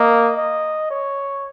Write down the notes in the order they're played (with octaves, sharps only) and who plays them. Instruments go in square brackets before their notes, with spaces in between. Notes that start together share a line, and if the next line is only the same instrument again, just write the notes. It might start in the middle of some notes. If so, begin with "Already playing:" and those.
Already playing: [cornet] A#3 [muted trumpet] D#5
[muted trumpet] D#5
C#5